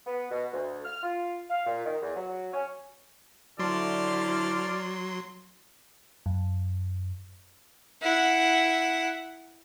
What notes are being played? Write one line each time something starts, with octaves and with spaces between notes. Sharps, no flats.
B3
B2
D2
F6
F4
F5
A#2
D#3
E2
F#3
C#4
D3 F#3 E4 C5 D5 A5 C6 F6
F#2
E4 F#5